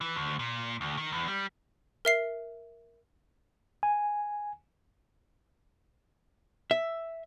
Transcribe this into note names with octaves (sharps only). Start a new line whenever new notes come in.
E3
D2
A#2
D2
D#3
E2
G3
A#4 E5 C7
G#5
E5